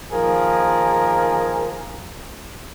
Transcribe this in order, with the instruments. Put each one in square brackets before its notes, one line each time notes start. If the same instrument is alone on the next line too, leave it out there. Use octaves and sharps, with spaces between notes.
[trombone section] D#3 F3 A#3 G#4 A#4